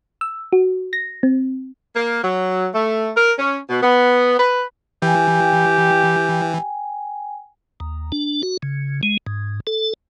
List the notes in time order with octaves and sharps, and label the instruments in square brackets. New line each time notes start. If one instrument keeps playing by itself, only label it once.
[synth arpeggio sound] E6
F#4
A#6
C4
[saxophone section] A#3
F#3
A3
A#4
C#4
B2
B3
B4
[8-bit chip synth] E3 [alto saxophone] G4 [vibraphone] G5 G#5
[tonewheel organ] D#2
D4
F#4
C#3
G#3
G#2
A4